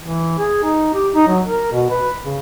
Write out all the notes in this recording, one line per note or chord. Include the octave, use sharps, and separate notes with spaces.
E3
G#4
D#4
G4
D#4
F#3
A#4
B2
B4
C#3